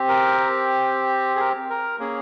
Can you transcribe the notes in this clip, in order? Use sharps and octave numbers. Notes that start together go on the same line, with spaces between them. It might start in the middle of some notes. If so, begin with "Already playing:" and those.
Already playing: C4 G4
A#4
G#4
A#4
A#4
A#3 C#4 G#4